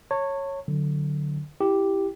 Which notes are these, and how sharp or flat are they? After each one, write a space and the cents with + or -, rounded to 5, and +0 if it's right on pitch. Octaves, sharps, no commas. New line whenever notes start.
C#5 -10 A5 +40
D3 +10 F#3 +0
E4 +0 G4 +0